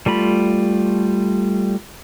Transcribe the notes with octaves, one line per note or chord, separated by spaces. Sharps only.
G3 A3 F4 B5